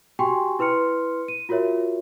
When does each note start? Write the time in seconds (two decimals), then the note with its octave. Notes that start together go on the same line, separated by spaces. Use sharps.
0.19 F#4 G4 G5 G#5 C6 C#6
0.59 E4 B4 C6 F6 C#7
1.28 D#7
1.49 F4 F#4 A#4 C#5 E5